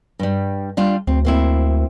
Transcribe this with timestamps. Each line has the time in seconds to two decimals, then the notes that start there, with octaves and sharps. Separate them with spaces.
0.19 G2 G3
0.77 G3 D4 F4
1.07 D2 C4
1.25 A#3 C4 E4